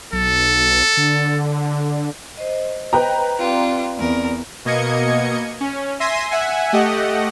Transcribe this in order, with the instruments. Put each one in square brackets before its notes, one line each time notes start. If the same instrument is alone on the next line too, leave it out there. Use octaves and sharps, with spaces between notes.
[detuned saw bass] B1 [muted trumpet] A4
[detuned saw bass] D3
[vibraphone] C5 D#5
[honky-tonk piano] B4 G5 A#5
[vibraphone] C4 D5 [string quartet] F4 G4
[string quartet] E2 A#4
[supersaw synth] B2 A#3 D#5 G#6 C#7
C#4
E5 G#5 C6 A#6 C7 D#7
E5 F#5 G#5
A3 G4 D#5 F#5